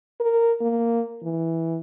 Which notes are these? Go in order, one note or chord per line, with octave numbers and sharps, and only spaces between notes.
A#4
A#3
E3